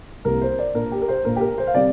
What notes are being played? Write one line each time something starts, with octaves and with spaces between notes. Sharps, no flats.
C2 C3 A#3 A#4
C5
D5
A#2 A#3 D4 A#4
G4
A#4
C5
A#2 A#3 D4 A#4
G4
A#4
C5
F5
C3 G3 C4 D5